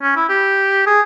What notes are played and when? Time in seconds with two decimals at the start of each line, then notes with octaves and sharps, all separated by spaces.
0.02 C#4
0.16 E4
0.29 G4
0.86 G#4